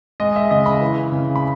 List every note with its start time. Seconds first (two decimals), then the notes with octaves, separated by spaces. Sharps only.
0.20 G#3 D#5
0.36 E5
0.51 C#3 D#5
0.66 B5
0.81 E3
1.12 C#3
1.36 B5